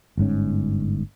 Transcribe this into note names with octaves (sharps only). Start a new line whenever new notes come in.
G1 G#2 C#4